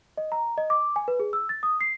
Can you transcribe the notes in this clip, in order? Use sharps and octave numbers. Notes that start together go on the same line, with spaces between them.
D#5
A#5
D#5
D6
G#5
B4
G#4
E6
A6
D#6
C7